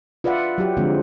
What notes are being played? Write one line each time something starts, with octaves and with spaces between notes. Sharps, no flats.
F4 B4 D5 E5 F#5
F#3 G4
D3 F3 G#3 C4